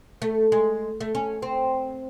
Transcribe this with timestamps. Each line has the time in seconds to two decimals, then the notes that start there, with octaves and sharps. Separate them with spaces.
0.22 A3
0.52 G#3
1.01 A3
1.15 C#4
1.42 C4